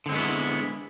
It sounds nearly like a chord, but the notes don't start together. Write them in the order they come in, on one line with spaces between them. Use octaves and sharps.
D3 C4 G#3 B3 E4